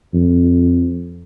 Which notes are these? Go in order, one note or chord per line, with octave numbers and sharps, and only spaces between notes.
F2